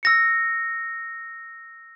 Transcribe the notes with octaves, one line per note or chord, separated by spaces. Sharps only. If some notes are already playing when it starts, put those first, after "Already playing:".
E6 A#6 C#7